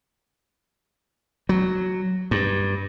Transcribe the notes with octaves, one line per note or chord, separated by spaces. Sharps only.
F#3
G2